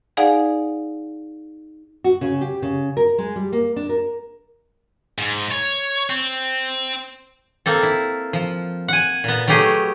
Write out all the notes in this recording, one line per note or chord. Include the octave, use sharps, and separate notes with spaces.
D#4 G#4 D5 F5 F#5 G#5
F#4
C#3
G4
C#3
A#4
G#3
G3
A#3
D4
A#4
G#2
C#5
C4
A#3 C4 A4
E4
F3
F#5 G#5
A#2 B3
F#3 A3 B3 G4 G#4